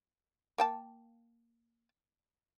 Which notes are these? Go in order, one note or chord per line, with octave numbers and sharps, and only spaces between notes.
A#3 G5 A5